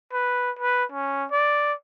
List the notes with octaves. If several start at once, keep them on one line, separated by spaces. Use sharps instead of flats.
B4
B4
C#4
D5